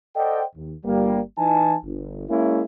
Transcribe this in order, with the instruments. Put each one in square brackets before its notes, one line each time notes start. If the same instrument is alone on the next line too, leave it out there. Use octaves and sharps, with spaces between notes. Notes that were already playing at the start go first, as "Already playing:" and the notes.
[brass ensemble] A4 C5 D5 D#5 F#5 G5
D#2
G1 G3 A#3
E3 D#4 G#5 A5
G1
G#3 A#3 C#4 E4